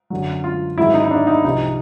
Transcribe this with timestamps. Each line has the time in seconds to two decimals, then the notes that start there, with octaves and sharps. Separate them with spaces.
0.10 F#2 D3 F#3
0.44 F4
0.77 G#2 D#3 F#3 E4
0.94 D#4
1.04 D#4
1.11 D4
1.27 D#4
1.44 C2 C3 F3 D#4